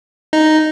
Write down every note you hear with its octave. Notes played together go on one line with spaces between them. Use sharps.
D#4